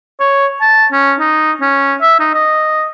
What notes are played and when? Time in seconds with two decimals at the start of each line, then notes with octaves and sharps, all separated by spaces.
0.20 C#5
0.62 A5
0.92 C#4
1.20 D#4
1.61 C#4
2.02 E5
2.20 D#4
2.34 D#5